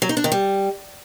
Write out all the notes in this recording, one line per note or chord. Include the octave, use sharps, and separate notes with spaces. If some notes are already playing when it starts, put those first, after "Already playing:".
F#3
D#4
D4
D#3
G3